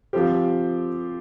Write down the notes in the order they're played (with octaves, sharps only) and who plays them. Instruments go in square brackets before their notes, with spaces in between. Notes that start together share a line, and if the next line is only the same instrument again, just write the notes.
[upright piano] F3 C4 G4